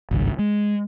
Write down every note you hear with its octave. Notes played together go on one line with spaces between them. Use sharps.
G#1 C#2 G2
G#3